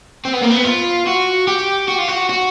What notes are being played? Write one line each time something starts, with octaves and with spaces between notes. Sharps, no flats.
C4
B3
A#3
B3
F4
F#4
G4
F#4
F4
F#4
F#4